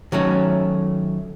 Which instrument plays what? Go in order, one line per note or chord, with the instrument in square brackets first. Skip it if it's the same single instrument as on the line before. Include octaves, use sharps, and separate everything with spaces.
[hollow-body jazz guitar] D#3 F#3 A3 C#4